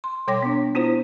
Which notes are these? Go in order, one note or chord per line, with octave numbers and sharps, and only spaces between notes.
C6
B2 G3 C#5 G5 D6 A#6
B3 D4
B3 E4 F4 C5